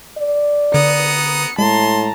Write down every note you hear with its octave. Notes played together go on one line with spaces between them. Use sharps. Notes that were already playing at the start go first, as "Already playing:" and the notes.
D5
D3 B3 A#5 D#6 C#7
A2 G#3 A5 A#5 C6